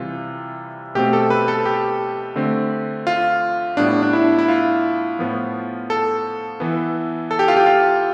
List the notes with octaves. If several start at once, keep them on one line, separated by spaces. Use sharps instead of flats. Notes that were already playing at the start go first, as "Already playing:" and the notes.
Already playing: C3 E3 G3 F4
B2 A3 C4 G4
A4
B4
A4
G4
D3 A3 C4
F4
A2 G3 B3 D4
D4
E4
E4
F4
A2 F3 B3
A4
E3 B3
A4
G4
F4
G4
F4